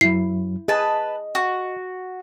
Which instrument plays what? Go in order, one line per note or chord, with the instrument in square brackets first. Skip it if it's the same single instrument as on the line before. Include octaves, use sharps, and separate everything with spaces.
[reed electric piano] F#2 F#3 [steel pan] E4 [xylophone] C7
[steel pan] G#4 [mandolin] B4 A5 [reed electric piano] D#5
[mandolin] F#4